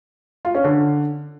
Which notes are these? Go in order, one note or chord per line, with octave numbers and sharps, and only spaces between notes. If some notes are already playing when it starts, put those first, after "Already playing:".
F4
C#4
D3